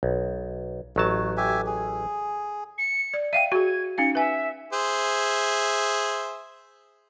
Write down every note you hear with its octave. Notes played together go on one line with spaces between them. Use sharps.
B1
A1 F#3 A3 A5
G4 E5 G#5
G#4
C#7
D5
E5 F5 G5 D#7
F#4 G#4 G#6
C#4 D#4 F5 C#7
B4 E5 G#5
G#4 C5 E5